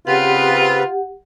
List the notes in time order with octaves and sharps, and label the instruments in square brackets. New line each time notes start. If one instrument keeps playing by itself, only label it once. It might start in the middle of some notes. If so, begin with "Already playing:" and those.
[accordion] C#3 C4 B4 [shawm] F4 [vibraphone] G4 F#5